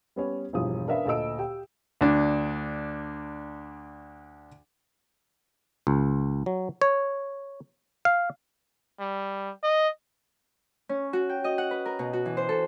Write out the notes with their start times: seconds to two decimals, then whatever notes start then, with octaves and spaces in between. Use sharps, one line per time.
0.16 G3 B3 C#4
0.53 E1 G2 E3 F3 D#6
0.87 C#4 D4 A#4 B4 E5 F5
1.06 D2 A#2 A4 D#5 E6 D7
1.38 G4 G5
2.01 D2 D4
5.87 C#2
6.46 F#3
6.82 C#5
8.05 F5
9.00 G3
9.63 D#5
10.89 C#4
11.13 F#4
11.29 G5
11.44 D#5
11.58 F#5
11.71 B4
11.86 A#4
11.99 B2
12.13 F#4
12.26 E3
12.37 C5
12.49 A4